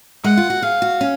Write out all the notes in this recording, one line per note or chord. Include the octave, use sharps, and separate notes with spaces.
G#3 F#5
F4
F#4
G#4 F5
F#4
C#4